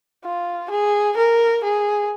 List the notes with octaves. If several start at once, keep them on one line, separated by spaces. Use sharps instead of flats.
F4
G#4
A#4
G#4